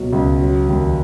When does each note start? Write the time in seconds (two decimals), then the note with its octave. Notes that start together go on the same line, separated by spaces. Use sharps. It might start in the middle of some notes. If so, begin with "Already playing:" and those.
Already playing: C#2 B2 F#3
0.13 C#2
0.41 F#3
0.69 D#2